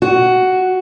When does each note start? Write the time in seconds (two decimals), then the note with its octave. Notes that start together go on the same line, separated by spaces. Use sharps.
0.02 F#4